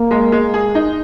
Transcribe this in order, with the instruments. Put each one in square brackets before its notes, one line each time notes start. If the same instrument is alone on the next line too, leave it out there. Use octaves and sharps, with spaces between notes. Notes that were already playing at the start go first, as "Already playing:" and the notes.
Already playing: [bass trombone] A#3
[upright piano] G#3
G#3
G#4
D#4